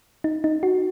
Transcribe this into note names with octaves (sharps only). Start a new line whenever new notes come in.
D#4
D#4
F#4